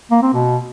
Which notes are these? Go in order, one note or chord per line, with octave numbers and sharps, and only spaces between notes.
A#3
C4
B2